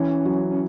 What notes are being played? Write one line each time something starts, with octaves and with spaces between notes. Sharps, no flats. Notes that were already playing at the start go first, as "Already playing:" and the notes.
Already playing: E3 C#4
F#3
C#4